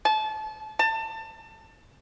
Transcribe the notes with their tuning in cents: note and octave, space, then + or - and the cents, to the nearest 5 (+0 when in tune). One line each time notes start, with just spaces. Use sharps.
A5 -30
A5 +25